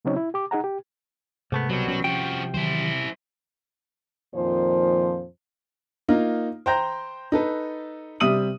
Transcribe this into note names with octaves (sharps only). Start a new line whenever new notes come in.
C#3 F#3 C4 C#4 D#4 C#5
E4
G4 D6
D#4 G#4 F#5 A#5
G4
G#2 C3 A3 B3
C2 B2 F#3 G3
F#3 C#4
C3 F3 F#4 G5
D#3 E3 F#3 E4 C5
F2 A#2 D#3 F3 C5
A#3 D#4 F4
C5 G5 A#5 G6 A#6
D#4 A4 B4
C3 G3 E5 D#6 D#7 F#7